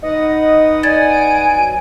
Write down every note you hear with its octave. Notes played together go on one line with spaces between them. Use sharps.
D#4 B4 D#5 F#5
D5 G#5 G#6 A6
D7
F#3